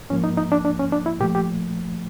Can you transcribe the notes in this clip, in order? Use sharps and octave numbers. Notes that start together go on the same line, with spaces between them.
G#2 F3 A#3 C#4
D#4
D#4
D4
D4
C#4
D4
E4
A#2 F3 A3 G4
G4